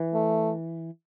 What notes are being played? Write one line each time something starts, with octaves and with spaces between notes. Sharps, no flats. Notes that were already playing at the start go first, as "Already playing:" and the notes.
Already playing: E3
A3